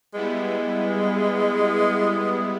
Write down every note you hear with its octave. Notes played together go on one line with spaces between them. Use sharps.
G3 G#3 B3 E4